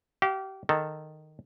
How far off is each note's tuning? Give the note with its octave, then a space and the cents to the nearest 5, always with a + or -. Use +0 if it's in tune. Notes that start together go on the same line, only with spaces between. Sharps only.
G4 -30 F5 +0
D#3 -10 A4 +0